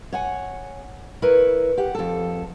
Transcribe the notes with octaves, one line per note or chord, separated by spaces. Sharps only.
C#5 F#5 G#5
E4 A#4 B4 C#5
G4 F#5
F2 A4